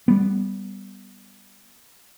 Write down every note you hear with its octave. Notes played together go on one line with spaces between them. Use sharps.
G3 B3